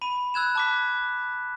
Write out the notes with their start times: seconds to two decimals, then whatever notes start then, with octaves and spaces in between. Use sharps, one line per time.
0.02 B5 D#7
0.34 E6 F#6 G#6 E7
0.55 A5 D6 B6